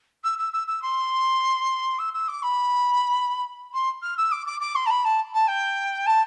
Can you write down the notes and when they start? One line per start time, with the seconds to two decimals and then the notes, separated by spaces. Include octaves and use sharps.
0.24 E6
0.38 E6
0.53 E6
0.67 E6
0.82 C6
1.98 E6
2.13 E6
2.28 D6
2.42 B5
3.73 C6
4.02 F6
4.17 E6
4.31 D6
4.46 D6
4.60 D6
4.75 C6
4.86 A5
4.90 B5
5.04 A5
5.33 A5
5.47 G5
6.06 A5